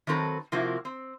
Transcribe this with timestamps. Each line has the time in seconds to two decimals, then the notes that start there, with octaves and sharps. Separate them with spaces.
0.07 D#3 F#3 C4 A4 B4
0.52 C3 F3 A#3 C4 E4 F#4
0.85 C4